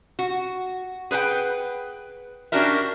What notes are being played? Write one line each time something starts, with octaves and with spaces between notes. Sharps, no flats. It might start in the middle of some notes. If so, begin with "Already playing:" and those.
F#4
G#4 B4 F#5 G5
C#4 D4 F#4 G4 A#4 E5